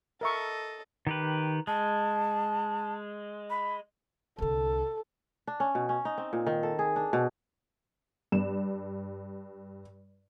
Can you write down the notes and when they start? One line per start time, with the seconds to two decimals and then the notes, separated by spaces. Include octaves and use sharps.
0.21 A4 A#4 D#5 E5 C#6
1.07 D#3 G4 B4
1.67 G#3 A5
3.50 B5
4.39 C2 D3 A4
5.47 D4
5.60 C#4
5.75 B2
5.89 C#4
6.05 D#4
6.18 C4
6.33 A#2
6.47 D#3
6.63 A4
6.79 G#4
6.96 D4
7.13 B2
8.32 G2 E7